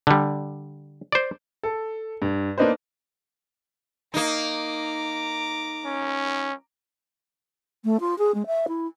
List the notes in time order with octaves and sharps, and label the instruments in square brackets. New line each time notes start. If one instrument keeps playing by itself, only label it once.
[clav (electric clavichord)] D3 G3
C5 D5
[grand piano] A4
G2
A#3 B3 D4 D#4 B4 C5
[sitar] A#3 D#4 [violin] A#5 D6
[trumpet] C#4
[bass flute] A3
F4
G#4
G#3
E5
E4